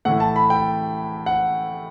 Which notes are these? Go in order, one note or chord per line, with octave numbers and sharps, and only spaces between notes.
A2 E3 F#5
A5
B5
G5
F#5